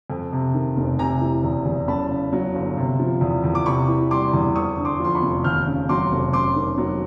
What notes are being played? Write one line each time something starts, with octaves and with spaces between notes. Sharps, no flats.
F2
C3
D#3
F1
C3 G#5 A#5
E3
E2
E2
F#2 A5 B5
C#3
F#3
G1
C3
F3
E2
E2
D6
C3 B5 C#6
E3
G3 C6 D6
E2
F2 C#6 D#6
D3
C6 D6
F3 C6
B5 C#6
F1
D#2 F6 G6
C#3
F#3 C6 D6
F1
F#2 C6 D6
D#3
F#3